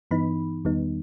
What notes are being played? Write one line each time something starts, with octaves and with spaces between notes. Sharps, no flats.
G2 E3 B3 D#4 B5
E2 D#3 G3 B3 D#4